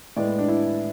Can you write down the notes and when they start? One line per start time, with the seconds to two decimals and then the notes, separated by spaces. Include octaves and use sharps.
0.16 A2 G#3 B3 D5
0.39 D4
0.48 E4